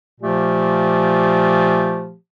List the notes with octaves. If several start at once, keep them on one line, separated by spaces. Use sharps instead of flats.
A#2 F3 A3 G4